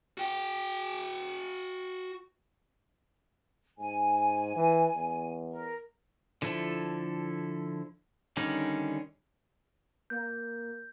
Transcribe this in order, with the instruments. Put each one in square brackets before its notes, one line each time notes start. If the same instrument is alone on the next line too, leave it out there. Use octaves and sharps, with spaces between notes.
[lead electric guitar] F#4 G5
[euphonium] G#2 [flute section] G#5
[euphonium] E3
E2
[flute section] A#4
[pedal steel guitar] D3 F3 E4 A4
D3 D#3 G3 C#4 D#4
[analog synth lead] A#3 [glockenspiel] G6